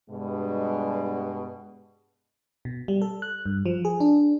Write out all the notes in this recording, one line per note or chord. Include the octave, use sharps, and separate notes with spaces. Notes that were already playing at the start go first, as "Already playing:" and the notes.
G2 B2 G#3
B2
G3
A4
F#6
G2
F3
G#4
D4